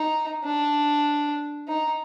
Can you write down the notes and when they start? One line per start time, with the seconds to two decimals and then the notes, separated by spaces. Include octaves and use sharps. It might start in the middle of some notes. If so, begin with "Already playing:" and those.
Already playing: D#4
0.44 D4
1.68 D#4